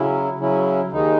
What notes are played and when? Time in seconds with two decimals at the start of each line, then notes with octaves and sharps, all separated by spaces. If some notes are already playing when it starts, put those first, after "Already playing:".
Already playing: C#3 F#3 C#4 E4
0.39 C#3 F#3 C#4 E4
0.92 D#2 D#3 G#3 D#4